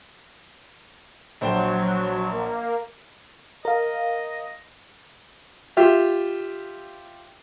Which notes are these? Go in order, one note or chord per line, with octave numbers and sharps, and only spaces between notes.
A#1 F#3 C5 G5
A#3
A#4 D#5 F5
F4 G4 E5